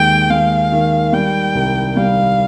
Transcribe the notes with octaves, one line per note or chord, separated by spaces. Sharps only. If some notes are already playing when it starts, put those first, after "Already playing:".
Already playing: D#2 G#3 G5
G#3 F5
D#3
G3 G5
C2
G3 F5